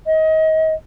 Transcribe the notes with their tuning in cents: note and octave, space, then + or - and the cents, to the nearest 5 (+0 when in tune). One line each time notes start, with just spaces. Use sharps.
D#5 +30